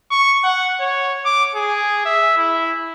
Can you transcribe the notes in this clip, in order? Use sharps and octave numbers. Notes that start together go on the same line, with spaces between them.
C#6
F#5
C#5
D6
G#4
E5
E4